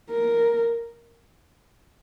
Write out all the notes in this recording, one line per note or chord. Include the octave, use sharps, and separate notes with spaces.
A#4